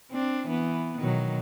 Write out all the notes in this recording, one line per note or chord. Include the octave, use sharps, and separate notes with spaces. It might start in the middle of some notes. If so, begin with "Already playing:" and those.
C4 D4
E3 B3
B2 D#3 F#3